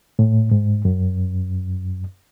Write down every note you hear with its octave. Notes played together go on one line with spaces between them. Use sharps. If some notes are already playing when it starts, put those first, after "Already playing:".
A2
G#2
F#2